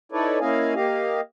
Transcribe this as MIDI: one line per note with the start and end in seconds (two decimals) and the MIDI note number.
0.12 0.39 63
0.12 0.39 64
0.12 0.39 69
0.12 0.39 71
0.12 0.39 73
0.12 0.39 74
0.40 0.75 58
0.40 0.75 61
0.40 0.75 64
0.40 0.75 75
0.40 0.75 77
0.40 0.75 80
0.75 1.21 58
0.75 1.21 67
0.75 1.21 75
0.75 1.21 77